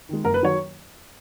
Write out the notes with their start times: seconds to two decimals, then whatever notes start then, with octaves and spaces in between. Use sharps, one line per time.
0.09 D#3 G#3
0.24 F#1 A#4
0.34 B4
0.41 D#3 F#3 C#5